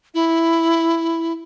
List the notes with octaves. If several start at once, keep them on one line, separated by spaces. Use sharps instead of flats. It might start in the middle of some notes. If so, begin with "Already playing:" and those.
E4